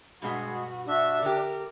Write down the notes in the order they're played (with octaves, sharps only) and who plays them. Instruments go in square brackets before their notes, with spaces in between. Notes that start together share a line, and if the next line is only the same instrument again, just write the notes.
[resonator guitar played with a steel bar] G2 B2 [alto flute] G#3 [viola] F#4
[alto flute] D4 [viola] F#4 E5
[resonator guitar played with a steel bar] D3 G4 [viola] A#4